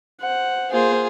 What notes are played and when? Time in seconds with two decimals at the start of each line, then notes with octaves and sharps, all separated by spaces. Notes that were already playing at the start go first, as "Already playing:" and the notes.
0.21 C5 F#5
0.70 A#3 F4 G#4 C5